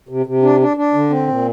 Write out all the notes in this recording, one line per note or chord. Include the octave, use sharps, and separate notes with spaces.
C3
C3
D4
D4
D4
D3
C4
A#2